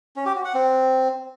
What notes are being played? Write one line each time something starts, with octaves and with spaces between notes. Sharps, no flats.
C#4
G4
F#4
F#5
C4